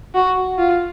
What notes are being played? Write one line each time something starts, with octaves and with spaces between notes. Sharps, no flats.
F#4
F4